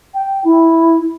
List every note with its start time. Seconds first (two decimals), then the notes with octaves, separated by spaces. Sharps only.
0.14 G5
0.44 E4